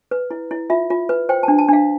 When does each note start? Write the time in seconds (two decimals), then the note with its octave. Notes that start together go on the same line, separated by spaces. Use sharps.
0.11 B4
0.31 E4
0.51 E4
0.70 F4 E5
0.90 F4
1.09 B4
1.29 C5 G5
1.43 D4 A5
1.58 A5
1.68 D4 F5